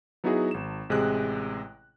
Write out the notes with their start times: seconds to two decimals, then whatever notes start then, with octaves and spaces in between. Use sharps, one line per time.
0.24 F#3 B3 D#4 E4 F#4 G#4
0.51 G#1 E7
0.89 A1 C3 G#3 G#4 F#6